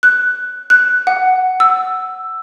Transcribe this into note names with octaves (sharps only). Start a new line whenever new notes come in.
F#6
F#6
F#5
E6